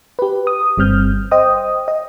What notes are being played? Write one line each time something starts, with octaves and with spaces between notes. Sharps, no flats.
G4 B4
D#6
G1 G3 C4 F6 G6
C5 D#5 G5 D#6
D#5